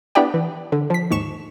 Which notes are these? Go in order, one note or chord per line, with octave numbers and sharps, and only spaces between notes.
B3 D4 E4 G4 D5 G5
E3
D3
F3 B6
D#2 G#2 C#6 E7